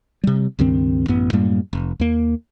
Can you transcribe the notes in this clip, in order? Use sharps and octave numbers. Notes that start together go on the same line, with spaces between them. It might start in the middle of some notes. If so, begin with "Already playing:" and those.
C3 G3
C#2 G2 D#3 C4
A1 F#2 B3
F#2 A2 G3 A#3
F1
D#2 A#3